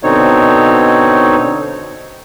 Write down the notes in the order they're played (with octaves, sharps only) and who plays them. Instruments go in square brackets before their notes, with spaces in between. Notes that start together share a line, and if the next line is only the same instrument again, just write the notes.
[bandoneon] B2 D3 C4 D#4 C#5